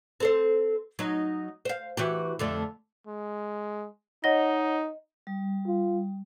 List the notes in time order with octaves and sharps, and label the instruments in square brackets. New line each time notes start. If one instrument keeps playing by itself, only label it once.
[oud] C4 A4 C5
F#3 D#4
C5 F5
E3 F#4 G4
F2 D3 A3
[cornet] G#3
[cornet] D#4 [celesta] C#5 F#5 G7 [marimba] D#5 A#6
[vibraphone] G3
[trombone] F4